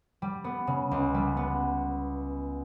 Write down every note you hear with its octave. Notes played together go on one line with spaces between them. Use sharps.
G3
B3
C#3
C#2
G3
B3